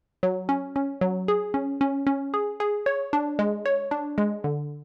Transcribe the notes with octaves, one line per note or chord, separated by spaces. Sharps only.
F#3
C#4
C#4
F#3
G#4
C#4
C#4
C#4
G#4
G#4
C#5
D4
G#3
C#5
D4
G#3
D3